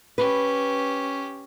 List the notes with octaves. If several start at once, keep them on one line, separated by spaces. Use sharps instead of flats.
C#4 G4 B4